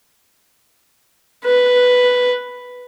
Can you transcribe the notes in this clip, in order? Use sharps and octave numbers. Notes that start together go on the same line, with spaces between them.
B4